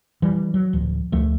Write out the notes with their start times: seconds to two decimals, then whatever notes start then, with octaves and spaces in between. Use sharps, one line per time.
0.22 E3 G3
0.54 F#3
0.73 D1 F3
1.12 D2 F3 A3